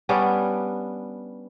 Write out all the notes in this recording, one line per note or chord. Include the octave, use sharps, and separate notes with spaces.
G3 B3 C#4 D4